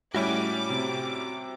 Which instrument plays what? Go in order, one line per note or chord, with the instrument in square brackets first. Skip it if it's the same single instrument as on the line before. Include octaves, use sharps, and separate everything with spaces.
[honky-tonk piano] A2 G3 C#4 [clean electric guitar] F#4 E5 [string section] D6
[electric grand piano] C3